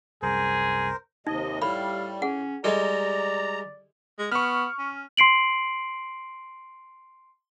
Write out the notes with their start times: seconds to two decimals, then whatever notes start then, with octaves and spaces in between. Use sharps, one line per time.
0.22 C2 F#2 G#4 A#4 C5
1.27 D#2 C3 D#4 D#5
1.62 A2 G3 F5 B5
2.22 C#4 G#4 F#5
2.64 G3 G#3 E4 G4 A4 D5 D#5 A#5
4.19 G#3
4.32 B3 C#6 F6
4.79 C#4
5.17 C6 C7 D7 F#7